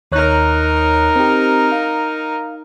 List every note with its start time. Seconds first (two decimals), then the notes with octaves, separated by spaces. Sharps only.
0.12 D#2 D#4 A#4 C#5 F#6
1.16 C4 G4
1.72 F5